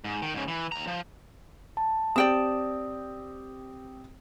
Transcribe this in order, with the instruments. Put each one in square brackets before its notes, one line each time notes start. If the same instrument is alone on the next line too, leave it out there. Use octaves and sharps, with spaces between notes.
[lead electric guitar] G#2
D#3
G#2 C#3
E3
D#2 A#5
F3
[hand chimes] A5
[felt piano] C4 G4 [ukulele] D5 G5 A5 [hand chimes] D#6